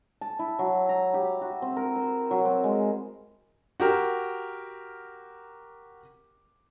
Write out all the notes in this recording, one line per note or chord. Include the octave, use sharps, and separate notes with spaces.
A5
E4
F#3
A#5
G4
F#4
C4
A#4
C5
F#3
C4
G#3
F#4 G4 A#4